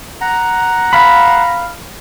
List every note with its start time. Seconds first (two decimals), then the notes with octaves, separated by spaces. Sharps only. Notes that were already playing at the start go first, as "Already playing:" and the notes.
0.21 F#5 A#5
0.93 F5 B5